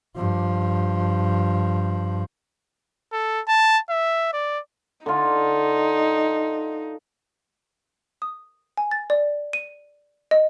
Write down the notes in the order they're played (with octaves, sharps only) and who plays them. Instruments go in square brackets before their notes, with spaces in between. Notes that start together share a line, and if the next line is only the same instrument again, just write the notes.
[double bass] G2 F3
[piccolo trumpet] A4
A5
E5
D5
[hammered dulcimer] D3 F4 [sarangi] D#4
[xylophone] D#6
G#5
A6
D5
D#7
D#5